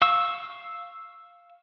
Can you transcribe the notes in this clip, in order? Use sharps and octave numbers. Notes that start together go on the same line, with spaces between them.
F5 C#6 E6